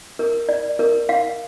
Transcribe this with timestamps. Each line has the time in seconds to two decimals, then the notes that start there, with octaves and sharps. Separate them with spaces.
0.19 A#4
0.49 D5
0.79 A#4
1.09 F5